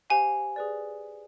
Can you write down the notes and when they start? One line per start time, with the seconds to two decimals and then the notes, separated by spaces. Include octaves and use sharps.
0.10 G4 C5 F5 G#5
0.56 G#4 B4 D5